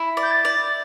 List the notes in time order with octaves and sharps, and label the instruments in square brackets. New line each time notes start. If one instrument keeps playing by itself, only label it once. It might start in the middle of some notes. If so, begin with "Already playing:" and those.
Already playing: [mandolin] E4
D5
[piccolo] G6
A6
[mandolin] D5